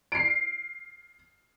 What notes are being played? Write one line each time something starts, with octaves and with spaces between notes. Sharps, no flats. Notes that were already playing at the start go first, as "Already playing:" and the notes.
C7 D7